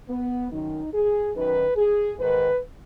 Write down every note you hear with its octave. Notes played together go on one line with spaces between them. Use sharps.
B3
F#2 D#3 D#4
G#4
F#2 D#3 B4
G#4
G#2 D#3 B4